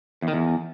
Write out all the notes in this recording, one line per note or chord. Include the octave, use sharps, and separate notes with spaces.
E2
D#3
E2